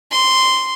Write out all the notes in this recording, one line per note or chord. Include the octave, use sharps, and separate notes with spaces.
C6